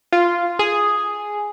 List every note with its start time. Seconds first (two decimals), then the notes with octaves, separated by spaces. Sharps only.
0.12 F4
0.59 G#4